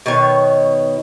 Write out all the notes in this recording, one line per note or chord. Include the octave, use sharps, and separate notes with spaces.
B2 D#3 D#4 C#5